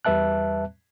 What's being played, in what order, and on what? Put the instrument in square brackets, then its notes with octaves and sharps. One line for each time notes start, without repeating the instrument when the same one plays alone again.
[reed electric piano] E2 G3 B4 E5 A5 F#6